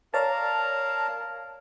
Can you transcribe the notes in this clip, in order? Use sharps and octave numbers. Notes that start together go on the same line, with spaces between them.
A#4 C#5 D5 F5 A5 A#5